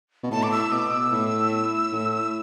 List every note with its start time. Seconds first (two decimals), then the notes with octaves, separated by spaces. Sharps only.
0.23 B2
0.31 A2 A5
0.43 D6
0.52 E6
0.72 B2 D6
0.92 E6
1.12 A2
1.92 A2